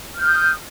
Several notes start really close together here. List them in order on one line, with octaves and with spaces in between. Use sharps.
F6 G6 D#6